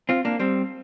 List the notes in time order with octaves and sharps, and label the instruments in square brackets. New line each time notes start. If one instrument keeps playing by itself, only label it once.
[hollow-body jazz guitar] C4 F4
A#3 D4
G3 C4